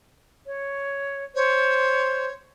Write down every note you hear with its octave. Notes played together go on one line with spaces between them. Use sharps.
C#5
C5 C#5